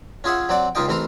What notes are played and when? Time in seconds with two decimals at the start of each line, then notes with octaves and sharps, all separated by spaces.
0.24 C#4 F4 G#4 E5 F#5
0.49 F#3 C4 D5 F#5
0.75 C#2 C#3 D#4 F4 D#5 G5
0.88 A1 E3 C4 A#4 A#5 C6